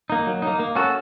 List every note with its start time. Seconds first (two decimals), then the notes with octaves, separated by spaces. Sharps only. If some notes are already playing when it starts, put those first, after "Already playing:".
0.10 A#3 D#4
0.27 F#3
0.42 A#3 D#4
0.60 A#3
0.75 C#4 F#4 A4